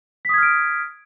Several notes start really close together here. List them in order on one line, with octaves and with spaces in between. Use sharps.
B6 D#6 G#6 F6 D7